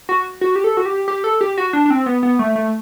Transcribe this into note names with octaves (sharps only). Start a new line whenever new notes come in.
F#4
F#4
G4
A4
F#4
G4
G4
A4
G4
F#4
D4
D4
C4
B3
B3
A3
A3